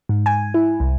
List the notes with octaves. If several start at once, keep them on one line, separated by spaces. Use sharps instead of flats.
G#2
G#5
E4
C2